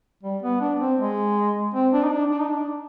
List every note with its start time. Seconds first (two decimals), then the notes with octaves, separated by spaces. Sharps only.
0.23 G3
0.43 B3
0.61 D4
0.80 C4
0.99 G#3
1.74 C4
1.93 D4
2.03 D#4
2.12 D4
2.30 D4
2.40 D#4
2.49 D4